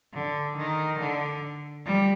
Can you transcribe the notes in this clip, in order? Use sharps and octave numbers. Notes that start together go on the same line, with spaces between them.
D3
D#3
D3
G3